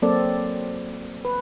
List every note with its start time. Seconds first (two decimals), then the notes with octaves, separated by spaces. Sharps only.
0.02 F#3 A#3 C4 A4 D5
1.25 B4